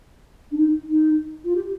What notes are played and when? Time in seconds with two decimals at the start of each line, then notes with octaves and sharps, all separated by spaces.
0.51 D4
0.57 D#4
0.90 D#4
1.44 F4
1.55 G4